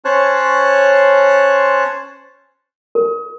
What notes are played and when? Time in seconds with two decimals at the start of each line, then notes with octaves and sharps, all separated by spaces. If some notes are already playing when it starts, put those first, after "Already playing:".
0.05 C#4 C5 C#5 A5 F#6
2.95 A#4